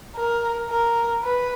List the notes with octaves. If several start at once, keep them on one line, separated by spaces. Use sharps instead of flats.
A#4
A#4
B4